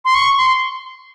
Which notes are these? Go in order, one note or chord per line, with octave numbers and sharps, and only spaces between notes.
C6
C#6
C6